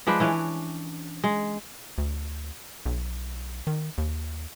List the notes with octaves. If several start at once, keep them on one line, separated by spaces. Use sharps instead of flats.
F3 G#3 D4 B4
E3 C#4 D4
G#3
D2
B1
D#3
D#2